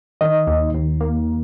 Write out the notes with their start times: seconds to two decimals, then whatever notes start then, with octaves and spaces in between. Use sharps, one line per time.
0.21 D#3 D#5
0.47 D#2
0.74 D#2
1.01 A#3